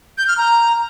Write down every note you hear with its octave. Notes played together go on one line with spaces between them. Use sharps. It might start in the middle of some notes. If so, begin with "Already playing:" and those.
G6
F6
A#5